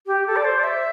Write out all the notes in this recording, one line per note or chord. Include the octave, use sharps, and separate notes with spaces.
G4
A4
D5
C5
D5
E5